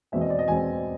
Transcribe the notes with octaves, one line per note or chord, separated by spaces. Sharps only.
E2 B2 G#3 C4 E5
D#5
D5
D#5
E2 B2 G#3 C4 G#5